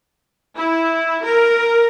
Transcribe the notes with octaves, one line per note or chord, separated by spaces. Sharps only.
E4
A#4